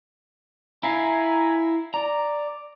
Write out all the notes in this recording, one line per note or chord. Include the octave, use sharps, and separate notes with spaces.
E4 E5 F5 G#5 A#5 B5
D5 A#5